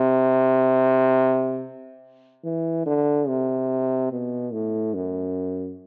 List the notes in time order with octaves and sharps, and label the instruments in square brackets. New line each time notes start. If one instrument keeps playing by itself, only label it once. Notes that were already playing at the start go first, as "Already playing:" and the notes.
Already playing: [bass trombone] C3
E3
D3
C3
B2
A2
F#2